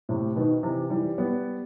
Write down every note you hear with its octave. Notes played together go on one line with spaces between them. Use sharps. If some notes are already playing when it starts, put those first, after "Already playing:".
A2 C3
B2 D#3
C3 E3
E3 G3
G3 B3